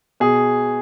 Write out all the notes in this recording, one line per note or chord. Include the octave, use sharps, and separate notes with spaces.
B2 G#4